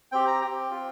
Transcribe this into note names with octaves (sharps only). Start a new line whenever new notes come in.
C4 G4 G5
A#5
C4 G4 G5
C4 F4